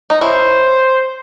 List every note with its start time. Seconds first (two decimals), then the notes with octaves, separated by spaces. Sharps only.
0.10 D#4
0.21 C#4 E4 C5